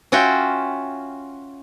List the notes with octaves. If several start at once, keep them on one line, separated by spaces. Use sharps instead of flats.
C#4 F4 F#4 E5 G5